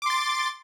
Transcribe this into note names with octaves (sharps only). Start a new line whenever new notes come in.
C6 D6 A6